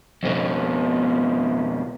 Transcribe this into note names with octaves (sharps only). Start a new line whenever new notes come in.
F2 B2